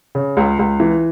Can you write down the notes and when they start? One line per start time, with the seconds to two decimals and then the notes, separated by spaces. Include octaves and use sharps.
0.15 C#3
0.37 C#2
0.59 C#2
0.80 E3